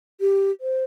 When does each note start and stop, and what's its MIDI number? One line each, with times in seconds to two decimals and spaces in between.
0.21 0.51 67
0.61 0.84 72